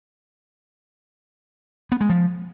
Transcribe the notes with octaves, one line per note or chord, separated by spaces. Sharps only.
B3
G#3
F3